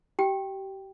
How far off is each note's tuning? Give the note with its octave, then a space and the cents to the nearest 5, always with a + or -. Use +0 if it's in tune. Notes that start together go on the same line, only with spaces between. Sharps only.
G4 -30 G5 +0